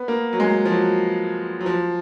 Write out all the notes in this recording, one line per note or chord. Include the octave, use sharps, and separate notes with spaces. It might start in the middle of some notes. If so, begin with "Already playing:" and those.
Already playing: B3
A#3
F#3
G#3
F3
F#3
F#3
F3